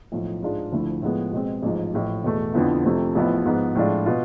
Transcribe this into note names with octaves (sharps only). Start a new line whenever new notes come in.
B1 A2 F3
G#2 G#3 D4 F4
D2 D3 F3 A3 E4
A2 F3 G#3 B3
B2 G#3 C4
A1 G#2 F3
A1 A2 F3
E2 B2 A3
F2 D3 F3 B3 E4
F2 C3 F3 A3
A1 A2 F3 B3 E4
G#2 F3 B3
A2 F3 G#3 D4 F4
B2 B3 F4